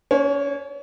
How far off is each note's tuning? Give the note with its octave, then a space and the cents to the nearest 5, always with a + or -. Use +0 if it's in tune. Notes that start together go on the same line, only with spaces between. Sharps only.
C#4 +30 C#5 -30